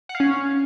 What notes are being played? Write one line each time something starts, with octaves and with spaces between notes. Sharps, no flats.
F#5
F5
C#4